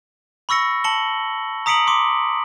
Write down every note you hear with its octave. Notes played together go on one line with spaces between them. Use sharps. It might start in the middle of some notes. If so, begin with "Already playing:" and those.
B5 C#6 E6 A#6 C#7
A5 C#7 F#7 G7
A#5 D#6 B6 C#7 D7 F#7
C6 D6